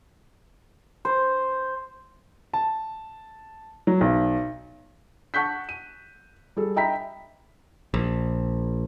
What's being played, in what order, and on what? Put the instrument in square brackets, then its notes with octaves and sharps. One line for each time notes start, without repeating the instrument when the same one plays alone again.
[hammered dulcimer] C5
[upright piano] A5
F#3
B1
[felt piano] F#5 A5 C#6 F#6 G6 B6
D#7
G3 G#4 A4
D#5 E5 G5 A#5 B5 B6
[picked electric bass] A#1